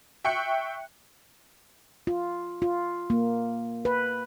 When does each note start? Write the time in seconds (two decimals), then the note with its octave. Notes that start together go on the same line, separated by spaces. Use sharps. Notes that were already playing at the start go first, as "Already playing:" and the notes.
0.25 E5 G5 C#6 F#6 C#7
2.07 F4
2.62 F4
3.10 A#3
3.85 B4